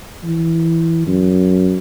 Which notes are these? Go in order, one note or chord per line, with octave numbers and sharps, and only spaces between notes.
E3
F#2